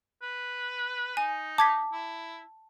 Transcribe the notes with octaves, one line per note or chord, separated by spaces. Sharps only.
B4
D#4 G#5
A5 D6 G#6 B6
E4